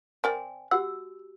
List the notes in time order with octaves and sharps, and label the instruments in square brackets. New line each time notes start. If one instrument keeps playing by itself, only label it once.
[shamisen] C4 A#4 D5 [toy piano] G#5
[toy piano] F#4 G4 E6 [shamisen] F#5